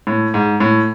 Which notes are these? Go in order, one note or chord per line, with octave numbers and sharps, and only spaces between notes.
A2
G#2
A2